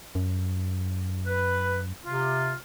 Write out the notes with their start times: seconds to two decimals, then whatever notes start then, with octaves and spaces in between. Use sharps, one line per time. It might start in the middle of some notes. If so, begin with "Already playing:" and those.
0.15 F#2
1.26 B4
2.05 C3 F4